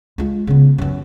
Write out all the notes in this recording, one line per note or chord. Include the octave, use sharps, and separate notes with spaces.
G#3 F4
C#3 B3
F#2 E3